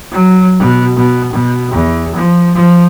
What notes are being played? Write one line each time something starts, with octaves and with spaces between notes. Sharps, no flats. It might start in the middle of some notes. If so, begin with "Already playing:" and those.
F#3
B2
B2
B2
E2
F3
F3